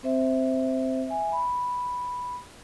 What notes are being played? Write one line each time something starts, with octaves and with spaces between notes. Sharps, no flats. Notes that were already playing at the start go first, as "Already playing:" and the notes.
C4 C5 E5
E5 G#5
B5